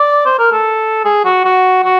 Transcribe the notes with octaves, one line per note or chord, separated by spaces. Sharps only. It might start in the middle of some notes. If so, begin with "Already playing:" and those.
Already playing: D5
C5
A#4
A4
G#4
F#4
F#4
F#4